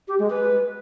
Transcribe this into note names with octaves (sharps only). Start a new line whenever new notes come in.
G4
G#3
B4